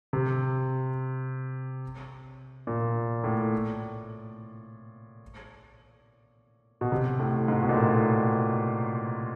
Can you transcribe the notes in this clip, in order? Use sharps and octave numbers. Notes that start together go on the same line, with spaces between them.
C3
A#2
A2
B2
C3
A2
G#2
B2
A#2
A2